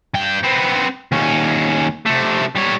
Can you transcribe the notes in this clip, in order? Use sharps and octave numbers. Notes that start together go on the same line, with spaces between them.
G2 G5
B3 C4
D#2 C#4
C3 A3
G3 C#5